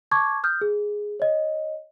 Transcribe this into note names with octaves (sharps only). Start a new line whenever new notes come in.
A5 C#6 D6 G#6
D#6 F6 G6
G#4
C#5 D#5